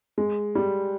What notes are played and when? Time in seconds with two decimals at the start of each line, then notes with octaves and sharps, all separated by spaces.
0.18 G#3
0.55 G3